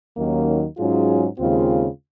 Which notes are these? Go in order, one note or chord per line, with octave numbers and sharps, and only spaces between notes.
D#2 D#3 F#3 A#3 C#4
G#2 F#3 C#4 F4 G#4
D#2 C#3 G#3 C4 F4